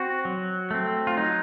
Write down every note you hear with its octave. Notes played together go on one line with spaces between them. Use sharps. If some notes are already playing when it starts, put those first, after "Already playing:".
Already playing: C4 F#4
F#3
A3 C4
F4
F#3 D#4